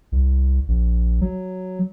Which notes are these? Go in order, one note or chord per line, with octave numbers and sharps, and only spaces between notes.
C2
A#1
F#3